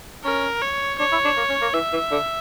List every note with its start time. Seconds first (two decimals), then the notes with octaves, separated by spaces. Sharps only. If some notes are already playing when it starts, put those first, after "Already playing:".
0.24 C#4 A#4
0.62 C#5
0.99 D4 C#5
1.12 E4
1.25 D4
1.37 A#3
1.49 C#4
1.61 A#3
1.74 E3 E5
1.93 E3
2.11 D3